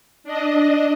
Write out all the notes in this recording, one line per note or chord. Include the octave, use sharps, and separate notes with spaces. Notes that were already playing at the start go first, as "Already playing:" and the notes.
D4 D#5